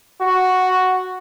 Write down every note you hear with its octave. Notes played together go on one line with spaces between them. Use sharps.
F#4